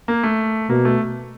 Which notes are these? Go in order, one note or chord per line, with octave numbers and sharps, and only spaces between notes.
A#3
A3
B2 A#3
A3